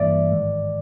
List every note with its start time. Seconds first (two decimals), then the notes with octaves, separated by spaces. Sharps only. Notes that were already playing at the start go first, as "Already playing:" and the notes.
Already playing: G#1 G2 E3 G3 A#3 D5 E5
0.31 A1 G#2 D#3 G#3